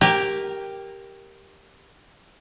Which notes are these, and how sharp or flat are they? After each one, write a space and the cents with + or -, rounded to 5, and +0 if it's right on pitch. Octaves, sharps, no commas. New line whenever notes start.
G4 +0 A#4 +0 G#5 -35